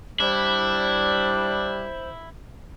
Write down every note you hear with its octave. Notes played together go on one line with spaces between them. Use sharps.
G3 D4 E4 C5